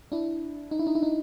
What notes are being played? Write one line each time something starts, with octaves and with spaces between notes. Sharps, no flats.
D4 E4
D#4
E4
D#4
E4
D#4